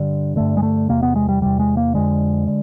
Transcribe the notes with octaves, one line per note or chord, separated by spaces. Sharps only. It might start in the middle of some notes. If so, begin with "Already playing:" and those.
Already playing: G2 D3
G2 D3 A3
G#3
A3
E2 C3 A#3
B3
G#3
G3
E2 C3 G3
G#3
A#3
F2 D3 G#3
D3